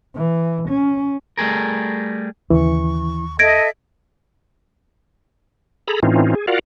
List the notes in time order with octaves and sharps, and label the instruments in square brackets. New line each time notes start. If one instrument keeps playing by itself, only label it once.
[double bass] E3
C#4
[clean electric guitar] G3 A3 G#4 A#4
[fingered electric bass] D#2 C#3 [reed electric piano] E3 [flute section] C#6
[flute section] A4 D#5 E5 [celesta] G#6 A#6 D7
[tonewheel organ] G#4 A4 A#5 B5
A2 E3 C4 C#4 D#4 F4
G#4
F4 F#4 A#4 D5 F5 F#5